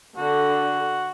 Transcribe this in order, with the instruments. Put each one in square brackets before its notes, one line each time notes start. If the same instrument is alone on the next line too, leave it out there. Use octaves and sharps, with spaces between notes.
[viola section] D3 [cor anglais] F#4